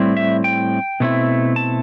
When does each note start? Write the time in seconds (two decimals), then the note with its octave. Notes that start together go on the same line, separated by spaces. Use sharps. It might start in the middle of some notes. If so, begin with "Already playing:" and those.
Already playing: A2 G3 C4 E4
0.17 E5
0.44 G5
1.00 B2 A3 C4 E4
1.56 A5